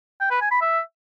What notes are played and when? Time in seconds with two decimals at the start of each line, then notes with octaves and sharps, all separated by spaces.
0.21 G5
0.31 B4
0.41 G#5
0.51 B5
0.61 E5